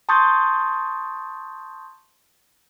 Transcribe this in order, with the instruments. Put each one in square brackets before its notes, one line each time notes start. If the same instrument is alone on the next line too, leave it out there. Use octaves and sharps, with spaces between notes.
[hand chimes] A5 C6 C#6 D#6 G6 A6